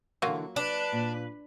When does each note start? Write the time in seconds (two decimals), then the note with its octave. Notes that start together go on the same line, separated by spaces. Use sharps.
0.22 D3 E3 F#3 A#3 F4
0.56 D4 B4 D5
0.92 A#2